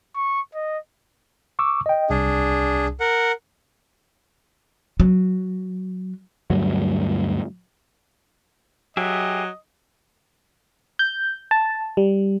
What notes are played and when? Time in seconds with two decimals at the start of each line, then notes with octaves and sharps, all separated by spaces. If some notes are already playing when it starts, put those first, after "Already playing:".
0.16 C#6
0.54 D#5
1.59 C#6 D6 E6
1.86 D#5 G5
2.10 C2 D4 G#4
3.00 A#4 F#5
5.00 F#3
6.50 D2 G2 F#3
8.97 F#3 G4 G#4 D#5 E5
10.99 G6
11.51 A5
11.97 G3